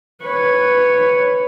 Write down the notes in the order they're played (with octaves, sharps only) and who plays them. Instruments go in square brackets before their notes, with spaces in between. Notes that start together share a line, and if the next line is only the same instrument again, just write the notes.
[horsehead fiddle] B4 C#5